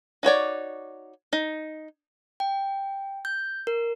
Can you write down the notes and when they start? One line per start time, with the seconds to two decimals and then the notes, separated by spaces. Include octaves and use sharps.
0.23 D#4 F#4 C#5 D5
1.33 D#4
2.40 G5
3.25 G6
3.67 A#4